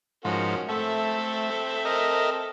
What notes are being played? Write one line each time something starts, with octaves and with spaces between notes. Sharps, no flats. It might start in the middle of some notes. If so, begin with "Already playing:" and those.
G#2 F3 C#4 F#4 A#4
A3 C4 A4 E5
A#4 D#5